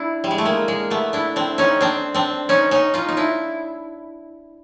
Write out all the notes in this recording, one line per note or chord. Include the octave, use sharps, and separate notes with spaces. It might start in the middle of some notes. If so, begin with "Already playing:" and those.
Already playing: D4 E4
G3
G#3
A3
G#3 A#3
G#3 A#3
A3 B3
D4 E4
C4 D4
C#4 D#4
C4 D4
C4 D4
C#4 D#4
C#4 D#4
D#4 F4
D#4
D4 E4